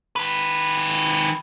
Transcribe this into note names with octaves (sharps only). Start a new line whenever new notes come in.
D#3 B4